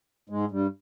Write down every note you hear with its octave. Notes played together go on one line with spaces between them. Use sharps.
G#2 G#3
G2 G3